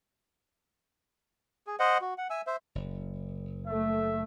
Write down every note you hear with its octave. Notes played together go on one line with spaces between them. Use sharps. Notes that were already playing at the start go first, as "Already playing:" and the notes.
G#4
C5 D#5 F#5
F#4
F#5
E5 G#5 E6
C5 E5
F#1
A3 E5